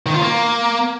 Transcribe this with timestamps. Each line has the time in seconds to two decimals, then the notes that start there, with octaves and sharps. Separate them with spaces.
0.06 D#3
0.14 F4
0.22 A#3